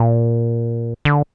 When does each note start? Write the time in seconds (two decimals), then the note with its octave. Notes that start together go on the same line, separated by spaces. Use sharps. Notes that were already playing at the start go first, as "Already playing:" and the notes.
Already playing: A#2
1.05 D3